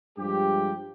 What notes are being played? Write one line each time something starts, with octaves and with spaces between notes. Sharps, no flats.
G2 F3 G#3 G4